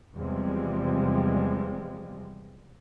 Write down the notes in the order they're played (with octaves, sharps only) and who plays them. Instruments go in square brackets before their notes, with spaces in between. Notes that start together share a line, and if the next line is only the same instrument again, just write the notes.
[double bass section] E2 C3 F3 G3 G#3 C4